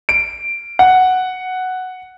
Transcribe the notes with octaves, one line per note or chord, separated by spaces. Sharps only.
D7
F#5